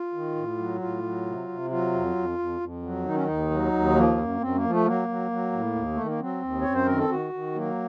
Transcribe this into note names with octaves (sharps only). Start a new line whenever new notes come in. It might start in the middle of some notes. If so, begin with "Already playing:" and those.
Already playing: F4
D#3
A2
F#3
A2 F4
F#3
C3
C3
F#3 F4
F2
F2
F2
F2
F#3
D#3 D#4
C#4
D#2 D#4
F#3
D#2
F3 A#3
F#2
F#2 C4
A#3
F3
A3
F#3 A#3
F#3
F#3
A2
D#2
A3
D#3
A#3
F#3 C4
D#2
F#2 C#5
C5
D#3 A#4
A4
D#3 F#4
D#3
F#3 A#3